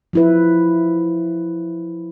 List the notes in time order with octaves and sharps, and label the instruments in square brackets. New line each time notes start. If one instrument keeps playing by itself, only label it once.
[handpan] F3 E4 B4